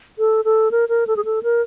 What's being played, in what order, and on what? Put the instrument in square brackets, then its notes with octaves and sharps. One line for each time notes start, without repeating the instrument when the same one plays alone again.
[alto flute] A4
A4
A#4
A#4
A4
G#4
A4
A#4